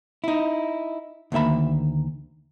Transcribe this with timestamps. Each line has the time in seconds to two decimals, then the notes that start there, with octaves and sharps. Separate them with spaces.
0.24 D#4 E4
1.32 D2 D#3 A#3 E5 B5